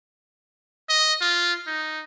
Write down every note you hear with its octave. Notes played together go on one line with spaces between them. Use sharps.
D#5
F4
D#4